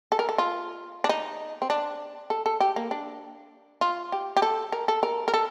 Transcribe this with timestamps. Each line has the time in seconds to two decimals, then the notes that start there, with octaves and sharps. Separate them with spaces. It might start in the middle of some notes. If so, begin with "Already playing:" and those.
0.12 A4
0.19 A#4
0.29 A4
0.38 F4
1.04 D4
1.09 D#4
1.62 C4
1.70 D4
2.30 A4
2.46 A4
2.60 G4
2.76 A#3
2.91 D4
3.81 F4
4.12 G4
4.37 G4
4.42 A4
4.72 A#4
4.88 A4
5.03 A#4
5.28 A#4
5.34 A4